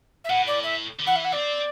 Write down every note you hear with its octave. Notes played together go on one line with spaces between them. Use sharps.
E5
A2 F#5
D5
E5
D3
E3 F#5
E5
F#5
C4 D5